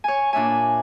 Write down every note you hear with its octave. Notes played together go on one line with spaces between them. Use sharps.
C#5 G#5
A#2 D4 E5 G#5